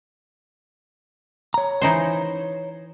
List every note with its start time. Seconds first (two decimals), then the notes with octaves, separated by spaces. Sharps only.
1.54 C#5 A#5
1.82 E3 D#4 C5